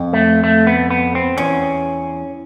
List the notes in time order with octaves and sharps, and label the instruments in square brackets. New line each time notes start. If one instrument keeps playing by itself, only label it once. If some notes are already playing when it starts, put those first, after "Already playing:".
Already playing: [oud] F2
[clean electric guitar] A3
A3
B3
B3
C4
[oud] E2 [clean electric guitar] C#4